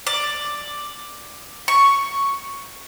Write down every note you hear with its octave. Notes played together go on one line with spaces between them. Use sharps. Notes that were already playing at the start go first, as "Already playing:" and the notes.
D5
C#6